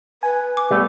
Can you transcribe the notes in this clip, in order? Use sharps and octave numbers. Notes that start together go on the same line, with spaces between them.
B4 G#5
D6
G3 A3 B3